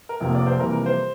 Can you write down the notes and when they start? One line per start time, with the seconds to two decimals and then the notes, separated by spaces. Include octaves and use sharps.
0.09 A#4
0.20 F1 F2 C3 F3 A#3
0.35 D5
0.47 C5
0.59 F2 C3 E3 G3 A#3 A#4
0.72 A#4
0.86 C5